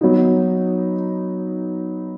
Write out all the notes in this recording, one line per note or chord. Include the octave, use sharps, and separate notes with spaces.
F#3 B3 D#4